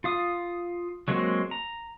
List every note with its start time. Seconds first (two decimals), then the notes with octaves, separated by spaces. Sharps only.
0.04 F4 F5 D#6
1.08 F#3 G#3 A#3 C4 F#4
1.51 A#5